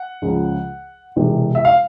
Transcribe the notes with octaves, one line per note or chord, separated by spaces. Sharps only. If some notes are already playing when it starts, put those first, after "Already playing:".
Already playing: F#5
C#2 C#3 F3
E1 E2 C3 E3
E5
F5